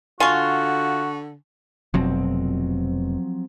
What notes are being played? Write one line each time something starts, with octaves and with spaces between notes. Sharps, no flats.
D3 F4 F#4 G#5 C#6
F1 B2 F3 F#3 C4